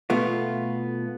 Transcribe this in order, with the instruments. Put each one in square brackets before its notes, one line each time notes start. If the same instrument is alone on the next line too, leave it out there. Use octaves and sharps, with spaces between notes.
[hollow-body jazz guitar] B2 A3 B3 F4